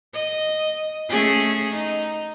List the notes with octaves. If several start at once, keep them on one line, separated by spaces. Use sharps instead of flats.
D#5
A3 C#4 G#4
D#4